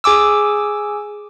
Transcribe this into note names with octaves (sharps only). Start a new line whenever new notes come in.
G#4 G#5 D6 E6